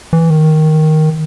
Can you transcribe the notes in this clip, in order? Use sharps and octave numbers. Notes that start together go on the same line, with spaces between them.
E3
D#3